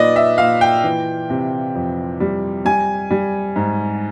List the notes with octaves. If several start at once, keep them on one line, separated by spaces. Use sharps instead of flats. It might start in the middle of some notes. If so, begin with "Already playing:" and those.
Already playing: A#2 D#4 B4 D5 D#5
E5
A#2 F5
G5
E3
C3
F2
G3
G3 G#5
G3
G#2